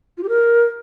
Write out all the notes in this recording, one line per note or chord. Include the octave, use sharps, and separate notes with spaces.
F4
G4
A#4